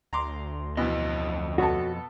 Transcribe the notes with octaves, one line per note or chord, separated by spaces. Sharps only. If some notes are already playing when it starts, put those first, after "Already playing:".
D2 A#5 C6 D6
F2 B2 E3 D#5
B2 B3 F#4 A4 C#5